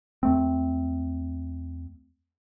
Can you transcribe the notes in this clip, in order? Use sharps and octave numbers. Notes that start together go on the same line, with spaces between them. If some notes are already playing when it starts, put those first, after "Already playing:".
E2 A3 C4